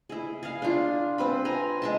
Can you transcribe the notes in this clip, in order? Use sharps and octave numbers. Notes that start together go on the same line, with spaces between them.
E4 G#4
G#4 F5
D4 F4
C4 B4 B5
G#5 A#5
G#3 E5 A5